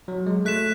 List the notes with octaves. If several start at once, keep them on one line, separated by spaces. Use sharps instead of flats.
F#3
G#3
A3 F#6 B6 E7